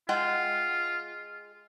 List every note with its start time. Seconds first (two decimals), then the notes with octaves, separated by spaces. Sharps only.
0.09 G#3 F4 F#5 G5